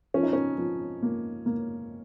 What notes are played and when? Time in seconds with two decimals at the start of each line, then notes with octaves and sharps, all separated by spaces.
0.14 F3 C#4
0.23 D#4
0.33 C#4
0.58 F3
1.03 A#3
1.46 A#3